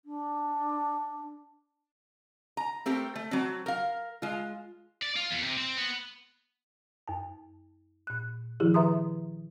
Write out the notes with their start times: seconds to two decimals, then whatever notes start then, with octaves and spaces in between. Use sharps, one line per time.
0.05 D4
2.57 A#5
2.86 A3 C4 G4 A#4
3.15 A3
3.31 F#3 C4
3.66 A#4 F5
4.22 G#3 F4
5.03 D5
5.16 F4
5.31 E2
5.43 C3
5.57 C4
5.77 B3
7.08 F#2 A5
8.07 A#2 F#6
8.60 D#3 F3 E4 G4 G#4
8.74 B4 E5 A#5 C6 D#6